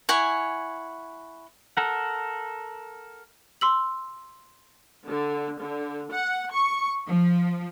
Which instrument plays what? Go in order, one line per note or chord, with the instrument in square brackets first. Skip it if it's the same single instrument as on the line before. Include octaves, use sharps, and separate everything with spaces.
[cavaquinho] E4 C#5 F#5 G#5
[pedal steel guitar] A4 A#4 F#5
[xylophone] C6 E6 F#7
[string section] D3
D3
F#5
C#6
F3